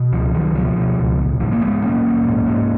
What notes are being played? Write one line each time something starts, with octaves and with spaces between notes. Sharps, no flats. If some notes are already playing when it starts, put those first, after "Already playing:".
Already playing: B2
C#2 F3
C#2 D#3 F#3
B2 F3
B2
C#2
A#1
G#2 F3
A#3
G#2 G#3 B3
A#1 A#3 C#4
A#1
G#2
G#2